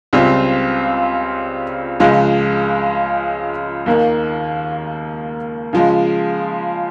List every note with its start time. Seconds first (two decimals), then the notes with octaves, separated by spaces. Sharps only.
0.13 C#2 C#3 G3 C4 F4
2.00 C#2 C#3 F3 G#3
3.86 D#2 D#3 A#3
5.73 C#3 F3 G#3